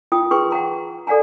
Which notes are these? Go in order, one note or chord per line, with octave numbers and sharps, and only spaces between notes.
F4 G5 D#6
G#4 B4 G5 C6 C#6
F#5 G5 A#5 C6
A4 D5 F#5 G#5 A#5